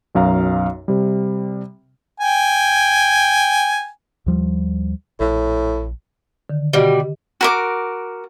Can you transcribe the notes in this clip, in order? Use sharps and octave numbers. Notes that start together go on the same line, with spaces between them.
B1 F#2 F5 A#5
C3 G3
G5 G#5
D#2 F3 G3
A#1 A2
D3 D#3
B2 G3 D#5 F6
G4
F#4 A#4 D6